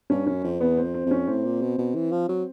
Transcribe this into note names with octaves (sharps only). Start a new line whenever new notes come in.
G2 C#4
F#2 C#4
F2 C4
E2 B3
F2 C4
C4
F2
C#4
A2 C4
A#2
B2
B2
E3
F3
F#3